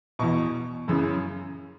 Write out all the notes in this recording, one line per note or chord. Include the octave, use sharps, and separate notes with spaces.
E2 B2 C#6
F#2 C#3 E3